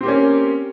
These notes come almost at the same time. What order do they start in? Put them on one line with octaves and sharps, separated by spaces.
C4 G4 A#3 C#4